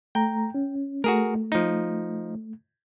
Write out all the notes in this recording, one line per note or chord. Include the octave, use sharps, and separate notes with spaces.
A3 G5 A#5
C#4
A3 F#4 G#4 A#4
F3 D#4